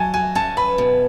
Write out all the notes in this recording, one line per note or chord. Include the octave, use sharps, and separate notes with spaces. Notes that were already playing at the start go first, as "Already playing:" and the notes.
Already playing: F#3 G#5 A5
F#4 G#5
C#4 A5
B4 B5
B2